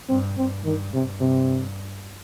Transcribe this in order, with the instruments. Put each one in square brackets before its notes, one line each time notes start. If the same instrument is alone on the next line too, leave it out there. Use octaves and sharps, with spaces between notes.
[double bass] G2 [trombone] C4
[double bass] G2 [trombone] C4
[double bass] G2 [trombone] D#3
[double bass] G2 [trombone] C3
[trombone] C3